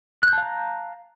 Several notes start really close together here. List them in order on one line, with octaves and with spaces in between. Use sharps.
F#6 G6 A5 F5 A#5